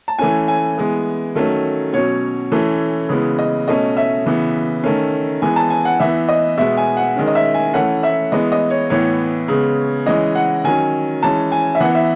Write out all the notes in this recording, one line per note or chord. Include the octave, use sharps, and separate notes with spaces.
A5
E3 A3 C#4 G#5
G#5
E3 G#3 B3
D#3 F#3 A3 C#4
B2 F#3 C#4 C#5
E3 A3 C#4
C#3 E3 G#3 B3
D#5
B2 A3 C#4 D#5
E5
C#3 E3 B3
D#3 A3 C#4
E3 G#3 B3 G#5
A5
G#5
F#5
E3 B3 E5
D#5
B2 G#3 B3 E5
G#5
F#5
D#3 G#3 C#4
D#5
E5
G#5
E3 A3 C#4 F#5
E5
E3 G#3 B3 D#5
D#5
C#5
A2 E3 B3 C#5
C#3 G#3 B3
E3 G#3 C#4 D#5
F#5
D#3 F#3 C#4 G#5
E3 G#3 C#4 A5
G#5
E5
E3 B3 F#5
E5